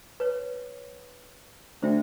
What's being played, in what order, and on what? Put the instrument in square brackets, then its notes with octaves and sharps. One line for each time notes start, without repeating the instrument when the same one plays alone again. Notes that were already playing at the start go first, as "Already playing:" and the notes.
[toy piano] B4 C#5
[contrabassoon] D2 [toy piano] C5 E5 G5